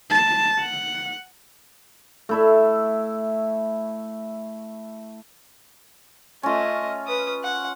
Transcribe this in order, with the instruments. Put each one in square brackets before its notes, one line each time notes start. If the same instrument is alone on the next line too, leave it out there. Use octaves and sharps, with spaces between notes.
[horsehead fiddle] A5
F#5
[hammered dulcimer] A3 E4 E5
[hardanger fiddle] A3 D#5 [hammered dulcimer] C#4 F4
[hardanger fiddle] B4 D#6
F#5